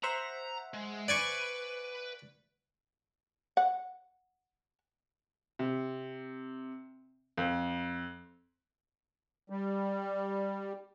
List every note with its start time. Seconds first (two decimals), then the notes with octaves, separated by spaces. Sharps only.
0.03 C5 E5 F#5 A#5
0.74 G#3
1.08 B4 D5 G#5 C#6
3.57 F#5
5.59 C3
7.37 F2
9.50 G3